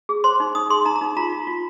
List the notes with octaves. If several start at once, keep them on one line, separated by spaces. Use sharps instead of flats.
G#4
C5 C6
D#4
D#4 D#6
G#4 C6
D#4 A#5
A#5
D#4
F4 A#5
F4
F4